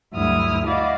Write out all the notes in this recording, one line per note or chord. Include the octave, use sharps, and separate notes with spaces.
D2 G2 F#3 E4 D#6 F6
E4 F#4 D5 D#5 F5